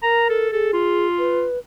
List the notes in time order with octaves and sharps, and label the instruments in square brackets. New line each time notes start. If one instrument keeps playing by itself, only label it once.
[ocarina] A#4 [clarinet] A#5
[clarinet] A4
[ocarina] G#4 [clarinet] A4
[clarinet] F4
[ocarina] B4